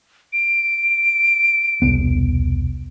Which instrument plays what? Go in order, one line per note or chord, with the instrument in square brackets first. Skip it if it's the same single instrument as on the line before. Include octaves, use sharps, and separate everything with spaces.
[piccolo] D7
[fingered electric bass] E1 C2 B3